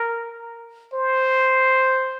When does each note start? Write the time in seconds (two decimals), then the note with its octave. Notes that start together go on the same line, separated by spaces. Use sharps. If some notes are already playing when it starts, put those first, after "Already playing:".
Already playing: A#4
0.94 C5